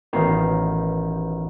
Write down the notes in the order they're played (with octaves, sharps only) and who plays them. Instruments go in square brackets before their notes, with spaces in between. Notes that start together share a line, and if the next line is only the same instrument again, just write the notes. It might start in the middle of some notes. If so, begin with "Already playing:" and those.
[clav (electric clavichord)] A1 B2 D#3 F5